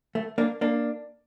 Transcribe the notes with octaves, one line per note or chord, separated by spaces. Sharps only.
A3
A#3 D4
A#3 D4